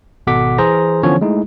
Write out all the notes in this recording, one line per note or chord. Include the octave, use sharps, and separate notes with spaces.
G#1 B2 A4 F#5 D6 B6
E3 G#4 C5 A#5 A#6
D3 E3 F3 B3 C#4 C#5
G#3 A3 D#4 E4